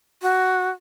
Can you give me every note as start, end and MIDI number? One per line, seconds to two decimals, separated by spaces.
0.22 0.69 66